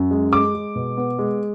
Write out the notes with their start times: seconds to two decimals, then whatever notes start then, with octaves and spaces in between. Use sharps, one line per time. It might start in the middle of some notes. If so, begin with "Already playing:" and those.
Already playing: F#2
0.11 G#3
0.32 G#3 D6
0.55 G#3
0.76 B2
0.97 B3
1.19 G#3